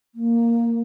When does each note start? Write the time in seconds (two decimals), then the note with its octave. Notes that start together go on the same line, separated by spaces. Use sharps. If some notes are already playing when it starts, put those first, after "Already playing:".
0.15 A#3